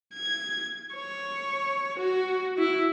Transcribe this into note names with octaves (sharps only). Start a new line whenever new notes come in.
G#6
C#5
F#4
E4